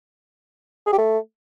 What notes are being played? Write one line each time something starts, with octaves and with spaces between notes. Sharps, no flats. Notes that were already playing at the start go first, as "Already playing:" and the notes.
G#4
G4
A3